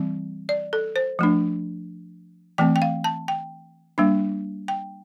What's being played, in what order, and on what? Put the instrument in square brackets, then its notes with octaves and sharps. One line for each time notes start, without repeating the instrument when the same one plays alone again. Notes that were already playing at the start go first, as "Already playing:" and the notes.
Already playing: [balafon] E3 G3 C4
D5
A4
C5
F3 A3 D4
E3 A3 C4 G5
G5
F5
A5
G5
G3 A#3 D4
G5